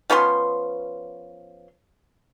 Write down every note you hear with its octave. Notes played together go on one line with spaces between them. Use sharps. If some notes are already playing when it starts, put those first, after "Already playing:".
F3 B3 C#4 C6